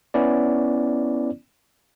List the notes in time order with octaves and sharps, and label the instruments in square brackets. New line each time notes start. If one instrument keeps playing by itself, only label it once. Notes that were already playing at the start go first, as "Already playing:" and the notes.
[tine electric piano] B3 C#4 E4 D5